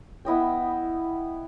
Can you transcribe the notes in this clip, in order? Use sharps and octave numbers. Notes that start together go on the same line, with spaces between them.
B3 E4 D#5 G5